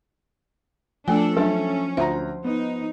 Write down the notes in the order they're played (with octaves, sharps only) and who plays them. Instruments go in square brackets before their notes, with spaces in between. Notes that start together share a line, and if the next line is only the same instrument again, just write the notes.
[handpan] F3 [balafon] A3 G#5 [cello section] D4 A4
[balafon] F#3 D4 [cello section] C#4 [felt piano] A4 E5
[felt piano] D2 A#5 [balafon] F4 E5 [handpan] C5
[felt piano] B3 [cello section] D#4